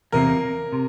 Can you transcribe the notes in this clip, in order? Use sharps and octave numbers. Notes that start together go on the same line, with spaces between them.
E2 C3 F3 A#3 A#4
C3